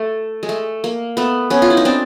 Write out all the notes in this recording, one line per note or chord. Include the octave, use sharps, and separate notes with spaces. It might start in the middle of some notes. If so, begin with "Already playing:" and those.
Already playing: A3
G#3
A3
A#3
A3 B3
B3 C#4
F4
E4
D#4
C4 D4